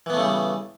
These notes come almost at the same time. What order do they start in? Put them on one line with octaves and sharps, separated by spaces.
E3 B3 A3 C#3 G3